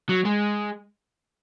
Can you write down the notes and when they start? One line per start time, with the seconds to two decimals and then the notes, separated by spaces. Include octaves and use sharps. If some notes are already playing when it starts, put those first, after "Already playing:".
0.09 F#3
0.25 G#3